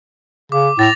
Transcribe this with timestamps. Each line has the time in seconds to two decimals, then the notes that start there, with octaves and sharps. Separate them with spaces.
0.52 C#3 D6
0.79 A2 A6 A#6 F7